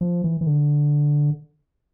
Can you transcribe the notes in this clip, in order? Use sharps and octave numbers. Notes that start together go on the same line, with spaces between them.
F3
E3
E3
D3